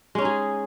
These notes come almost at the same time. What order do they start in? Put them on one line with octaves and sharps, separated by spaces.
G#3 C#4 D#4 G#4